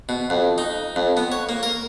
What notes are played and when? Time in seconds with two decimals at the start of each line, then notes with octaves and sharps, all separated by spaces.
0.09 B2
0.30 F2
0.58 D#4
0.96 F2
1.17 B3
1.32 C#5
1.49 A#3
1.63 A#4